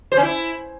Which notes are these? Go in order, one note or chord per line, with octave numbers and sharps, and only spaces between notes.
C5
C#4
E4